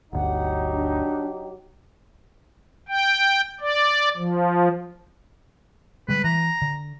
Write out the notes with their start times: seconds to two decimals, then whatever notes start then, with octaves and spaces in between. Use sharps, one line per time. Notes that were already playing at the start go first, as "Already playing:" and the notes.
0.13 G1 D2 F#3 D#4 G4 F#5
0.73 D4
2.88 G5
3.61 D5
4.17 F3
6.09 D3 G3 G#3 B4
6.24 E3 A#5
6.62 D3